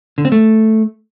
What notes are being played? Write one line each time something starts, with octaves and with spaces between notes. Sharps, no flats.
D3
C4
A3